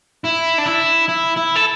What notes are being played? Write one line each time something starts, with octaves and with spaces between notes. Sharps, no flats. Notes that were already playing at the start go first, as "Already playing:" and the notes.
E4
D4
E4
E4
E4
A4